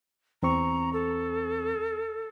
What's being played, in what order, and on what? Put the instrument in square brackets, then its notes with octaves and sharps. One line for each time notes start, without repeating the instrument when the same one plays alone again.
[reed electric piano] E2 C4 C#6 [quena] A#5
[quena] A4